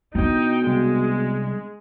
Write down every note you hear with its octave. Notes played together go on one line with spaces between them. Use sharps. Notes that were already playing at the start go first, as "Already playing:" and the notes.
B2 B3 D4 D#4 G5
C2 G#3